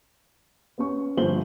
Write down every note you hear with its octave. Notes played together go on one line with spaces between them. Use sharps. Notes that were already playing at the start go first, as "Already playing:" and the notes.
B3 C#4 C#6
G1 F3 C5 F#7 G7